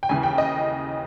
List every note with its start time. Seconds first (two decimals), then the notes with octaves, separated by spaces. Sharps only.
0.03 G5
0.09 D#2 C#3 E3 G#5
0.23 G5
0.38 D#5